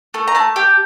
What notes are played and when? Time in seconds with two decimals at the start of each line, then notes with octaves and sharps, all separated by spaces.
0.14 A3
0.28 A#5
0.35 A3 A5
0.56 G4